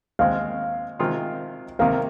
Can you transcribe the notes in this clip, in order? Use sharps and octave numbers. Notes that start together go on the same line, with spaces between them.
D#2 D#3 G#3 C4 F5
C3 D#3 G#3 C4 F4
C3 D#3 A#3 F5